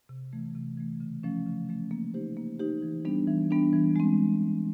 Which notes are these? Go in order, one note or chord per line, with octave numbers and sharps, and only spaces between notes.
C3
E3 A3
C3
E3 A3
C#3
F3 A3 C#4
C#3
F3 A3 C#4
A#3
D#4 G4 C5
A#3
D#4 G4 C5
E3
G3 B3 D4
E3
G3 B3 D4
E3
G#3 C4